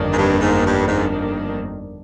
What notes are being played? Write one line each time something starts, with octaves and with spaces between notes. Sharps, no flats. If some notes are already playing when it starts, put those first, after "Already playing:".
Already playing: G1 F2 D#3 A#3 D4
G#2
G2
G#2
G2
G#2